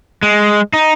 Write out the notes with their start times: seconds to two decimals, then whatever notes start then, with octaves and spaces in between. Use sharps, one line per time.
0.23 G#3
0.73 D#4